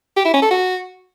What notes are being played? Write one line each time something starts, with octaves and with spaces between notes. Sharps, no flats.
G4
E4
C#4
A4
F#4